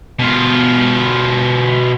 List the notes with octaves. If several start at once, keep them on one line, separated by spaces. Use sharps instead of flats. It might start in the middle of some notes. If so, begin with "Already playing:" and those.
B2 F4